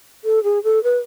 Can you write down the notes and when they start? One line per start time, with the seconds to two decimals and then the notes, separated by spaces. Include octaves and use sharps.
0.24 A4
0.44 G#4
0.64 A4
0.84 B4